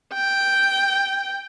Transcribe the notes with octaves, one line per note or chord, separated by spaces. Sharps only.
G5